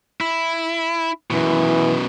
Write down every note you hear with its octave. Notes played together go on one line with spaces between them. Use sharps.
E4
F#2 B2 E3